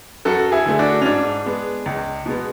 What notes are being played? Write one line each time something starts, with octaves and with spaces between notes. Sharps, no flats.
F#2 F#4 A4
E4 G#4
D3 A3
D4 F#4
C#4
G#2 D4
G#3 B3
C#2
B2 G#3 B3